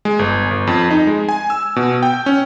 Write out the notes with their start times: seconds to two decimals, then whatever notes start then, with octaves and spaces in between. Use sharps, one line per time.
0.05 G#3
0.19 G1
0.51 G1
0.67 F2
0.90 D#4
1.07 G#3
1.29 G#5
1.50 E6
1.76 B2
2.03 G5
2.26 C#4